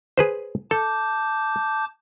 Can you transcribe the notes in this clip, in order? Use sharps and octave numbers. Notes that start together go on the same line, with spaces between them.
G#4 B4 C5
A4 A5 D6 G6